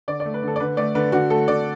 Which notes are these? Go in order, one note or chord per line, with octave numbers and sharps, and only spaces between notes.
D3 D5
D5
A3
B4
D3 A4
D5
D3 B4
A3 D5
D3 B4
D3 F#4
A3 A4
D3 D5